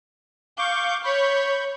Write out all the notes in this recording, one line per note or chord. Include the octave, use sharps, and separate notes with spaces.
F5 C#6 D6 G6
C#5 B5 C#6 G6